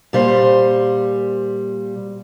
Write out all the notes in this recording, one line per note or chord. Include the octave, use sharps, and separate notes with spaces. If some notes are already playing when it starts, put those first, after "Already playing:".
A#2 G3 C5